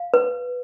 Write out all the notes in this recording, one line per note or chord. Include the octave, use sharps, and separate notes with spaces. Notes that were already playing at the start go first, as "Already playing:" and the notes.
Already playing: F5
B4